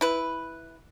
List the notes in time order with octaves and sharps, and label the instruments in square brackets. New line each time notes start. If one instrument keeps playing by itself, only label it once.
[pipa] E4 B4